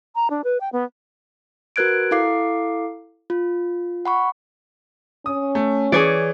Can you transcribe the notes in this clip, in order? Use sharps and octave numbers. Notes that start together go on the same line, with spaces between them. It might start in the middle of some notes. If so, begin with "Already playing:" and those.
A#5
D4
B4
G5
B3
F#4 A#4 B4 F#6 G#6 D7
E4 A4 F5 D6 C7
F4
F#5 B5 C#6
C#4 D#6
A3
E3 G#4 C#5 D5